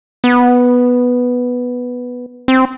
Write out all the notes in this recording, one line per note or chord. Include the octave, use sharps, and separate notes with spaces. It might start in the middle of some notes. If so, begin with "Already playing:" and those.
B3
C4